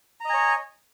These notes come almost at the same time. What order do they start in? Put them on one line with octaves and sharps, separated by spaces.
A#5 D#5 G#5 C#5